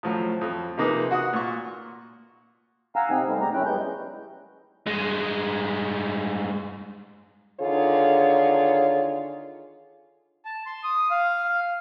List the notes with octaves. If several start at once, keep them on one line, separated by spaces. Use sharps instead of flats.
A2 F3 F#3
F2
C3 F3 A#3 D#4 G#4 B4
F#4 F#5 D#6
A#2 C#6
F5 F#5 G#5 A#5 E6
C3 C4 D#4
G3 A3 B3 D#4
D2 G#3 G4 A#5
F#2 C#4 E4 G5 F#6
G3 G#3 B3 G6
G2 G#3
D3 D#3 F4 G#4 C#5
A5
C6
D#6
F5